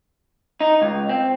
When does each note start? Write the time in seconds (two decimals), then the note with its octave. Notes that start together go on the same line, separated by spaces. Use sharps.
0.61 D#4
0.82 C#2
1.09 C4